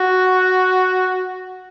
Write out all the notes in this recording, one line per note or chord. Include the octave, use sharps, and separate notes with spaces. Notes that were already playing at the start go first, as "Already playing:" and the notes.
Already playing: F#4